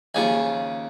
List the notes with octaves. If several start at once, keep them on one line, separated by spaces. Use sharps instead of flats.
D#2 C#3 F3 G#5